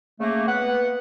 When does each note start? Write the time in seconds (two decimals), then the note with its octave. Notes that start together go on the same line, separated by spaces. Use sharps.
0.20 C#3 A3 A#3
0.47 B3 B4 F#5